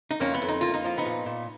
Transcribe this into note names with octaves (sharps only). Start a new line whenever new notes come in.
D#4
F2 A#3 C#4
B3
F2
D#4
A#3 F4
D#4
F3 F4
B3 D#4
A#2
A#2